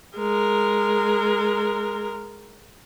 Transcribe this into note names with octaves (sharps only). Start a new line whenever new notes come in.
G#3 A#4